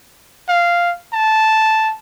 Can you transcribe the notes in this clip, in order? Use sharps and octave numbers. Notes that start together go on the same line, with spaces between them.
F5
A5